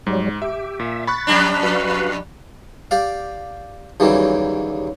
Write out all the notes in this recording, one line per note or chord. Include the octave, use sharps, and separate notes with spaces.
G#2 F#3 G3
G4 E5
A#2 E5
B5 C#6 F#6 A6
F2 G3 D4
F#4 B4 F5
G4 D5 F5
D#2 C#3 E3 F#3 G3